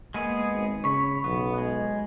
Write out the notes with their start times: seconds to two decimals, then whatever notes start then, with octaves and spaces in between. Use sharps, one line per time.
0.14 G#3 A#3 B3 G#4
0.53 G#1
0.84 C#3 C#5 B5
1.24 B1 B3
1.58 G#3